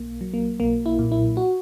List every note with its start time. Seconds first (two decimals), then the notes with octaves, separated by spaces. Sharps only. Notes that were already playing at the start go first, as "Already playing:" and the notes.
Already playing: B1 A#3
0.21 F#3
0.34 A#3
0.60 B1 A#3
0.86 E4
0.99 A#2
1.12 E4
1.37 F#4